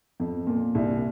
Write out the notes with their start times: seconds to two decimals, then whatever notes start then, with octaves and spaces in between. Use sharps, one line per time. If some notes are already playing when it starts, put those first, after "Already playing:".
0.20 F2
0.47 A#2
0.75 C2